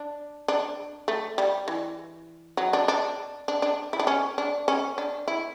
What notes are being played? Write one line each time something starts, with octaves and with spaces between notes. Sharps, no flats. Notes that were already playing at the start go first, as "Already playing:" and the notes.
Already playing: D4
D4
A3
G3
E3
F#3
D4
D4
D4
D4
E4
D4
C#4
D4
C#4
D4
E4